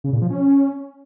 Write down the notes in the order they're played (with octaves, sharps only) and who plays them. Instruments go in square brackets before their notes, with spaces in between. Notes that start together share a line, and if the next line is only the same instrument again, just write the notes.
[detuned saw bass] C#3
A#2
F3
C#4